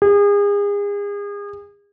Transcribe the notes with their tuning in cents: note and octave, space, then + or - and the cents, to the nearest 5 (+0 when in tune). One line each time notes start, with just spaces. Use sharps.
G#4 -35